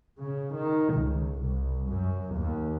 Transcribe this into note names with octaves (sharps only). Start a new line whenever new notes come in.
C#3
D#3
C#2
C2
F#2
D#2